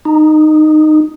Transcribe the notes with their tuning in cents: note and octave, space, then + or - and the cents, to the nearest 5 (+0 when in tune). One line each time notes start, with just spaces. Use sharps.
D#4 -15